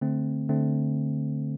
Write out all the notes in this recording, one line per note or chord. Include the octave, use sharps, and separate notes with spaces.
D3 A3 C4
D3 A3 C4